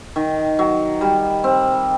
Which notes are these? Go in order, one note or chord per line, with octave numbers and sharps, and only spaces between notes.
D#3
F#3
G3
C4